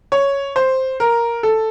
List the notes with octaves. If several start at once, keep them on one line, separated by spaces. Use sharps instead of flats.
C#5
C5
A#4
A4